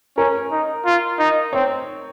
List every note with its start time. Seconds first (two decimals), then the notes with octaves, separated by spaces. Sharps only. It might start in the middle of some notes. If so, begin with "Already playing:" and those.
0.18 C#4 A#4
0.52 D#4
0.86 F4
1.19 D#4
1.53 C4 C#5